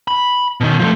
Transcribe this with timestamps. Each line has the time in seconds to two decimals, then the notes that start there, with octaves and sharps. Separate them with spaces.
0.08 B5
0.61 B2 D#3
0.80 F3 A3